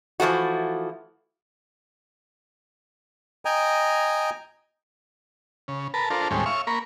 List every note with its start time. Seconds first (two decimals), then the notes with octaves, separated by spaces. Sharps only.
0.20 E3 F3 A3 F#4
3.45 D#5 G5 G#5 A#5
5.68 C#3
5.94 A#4 B4 A5
6.10 D4 F4 A4 A#4 C5
6.31 D#2 A2 G3 G#3 C4 C#4
6.46 C#5 E5 F5 C#6
6.67 A#3 A#4 B5 C#6